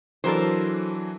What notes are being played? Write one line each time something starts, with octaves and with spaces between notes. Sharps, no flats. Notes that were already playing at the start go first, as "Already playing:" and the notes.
E3 F#3 D4 A4 A#4 C5